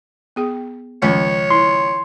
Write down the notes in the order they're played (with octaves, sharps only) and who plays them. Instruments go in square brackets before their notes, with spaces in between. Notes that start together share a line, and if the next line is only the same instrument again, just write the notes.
[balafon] B3 G#4 G5
[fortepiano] C#2 [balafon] D#3 F3 C#4 [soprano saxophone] C#5
[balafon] E4 [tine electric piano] C6